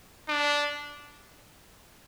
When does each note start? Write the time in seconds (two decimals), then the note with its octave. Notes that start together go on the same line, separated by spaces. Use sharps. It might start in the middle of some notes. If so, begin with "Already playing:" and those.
0.28 D4